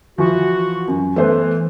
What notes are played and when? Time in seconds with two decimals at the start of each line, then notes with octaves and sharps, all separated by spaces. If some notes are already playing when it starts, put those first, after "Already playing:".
0.18 E3 F3 F#4
0.88 F#2
1.16 E3 A3 B3 C5